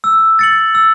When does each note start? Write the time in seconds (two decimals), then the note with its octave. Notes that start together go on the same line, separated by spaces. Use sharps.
0.04 E6
0.39 A6 C#7 F#7
0.75 E6